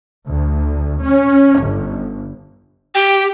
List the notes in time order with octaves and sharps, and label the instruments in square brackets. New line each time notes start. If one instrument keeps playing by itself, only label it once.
[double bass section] D2
C#4
G1
[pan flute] G4 [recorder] G5